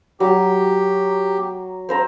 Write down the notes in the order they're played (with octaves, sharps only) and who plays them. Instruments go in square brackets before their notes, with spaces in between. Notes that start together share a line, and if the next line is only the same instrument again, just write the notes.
[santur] F#3 [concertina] G4
[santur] C4 C5 A#5